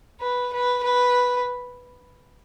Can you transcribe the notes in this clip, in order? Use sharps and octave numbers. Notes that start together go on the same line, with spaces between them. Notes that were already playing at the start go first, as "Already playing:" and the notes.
B4
B4
B4